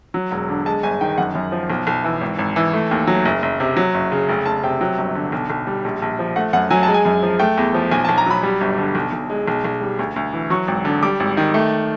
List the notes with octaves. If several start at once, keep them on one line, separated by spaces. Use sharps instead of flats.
F#3
E1
D3
G#3 A5
G1 G#5
D#3 G5
F#2 F#5
F#2
F3
B1
B1
E3
G#1
G#1
E3
A3
D#2
F#3
F#1
F#1
C3
F#3
F#1
C#3
F1
F1 A5
C3 G5
F#3 G5
G1
D3
B1
B1
G3
A#1
A#1
F3
A3 F#5
F#2 F#5
F#3 G#5
A5
G#3
G#5
F#2
F3
A3 G5
E2
F3
B1 G#5
A5
B1
A#5
F#3 B5
G3
G1
D3
B1
B1
G#3
B1
B1
G3
D2
D2
E3
F#3 C#6
G#1
D3
G3 D6
G#1
D#3
A3